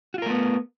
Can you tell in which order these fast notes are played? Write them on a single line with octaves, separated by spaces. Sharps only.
F#4 F4 A#4 A3 B3